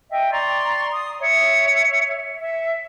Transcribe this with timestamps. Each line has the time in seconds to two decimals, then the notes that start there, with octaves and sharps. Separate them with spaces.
0.10 D#5 E5 G5
0.30 D5 A#5 C6 C#6
0.91 D#6
1.19 C#5 E5
2.39 E5